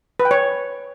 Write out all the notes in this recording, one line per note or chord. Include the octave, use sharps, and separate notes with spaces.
B4
G5
C#5